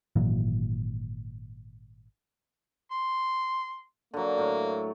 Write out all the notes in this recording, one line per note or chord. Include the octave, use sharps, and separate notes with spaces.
G#1 A#2 E3 F#3
C6
D3 F#3 A#3
A2 C#5